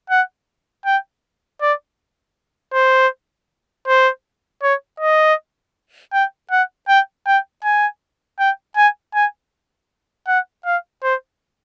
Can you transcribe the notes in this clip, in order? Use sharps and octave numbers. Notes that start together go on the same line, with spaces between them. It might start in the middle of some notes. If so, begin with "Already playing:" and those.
F#5
G5
D5
C5
C5
C#5
D#5
G5
F#5
G5
G5
G#5
G5
G#5
G#5
F#5
F5
C5